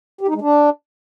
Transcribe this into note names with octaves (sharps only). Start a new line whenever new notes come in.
G4
D#4
G#3
D4